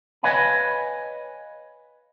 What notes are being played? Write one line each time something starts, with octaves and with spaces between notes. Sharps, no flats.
B4 C#5 D#5 F5 G#5 B5